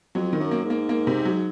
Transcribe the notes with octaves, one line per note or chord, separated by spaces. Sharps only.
F2 F#3
D#3
F#2
A#3
G#2
A#3
A#3
C3
F#3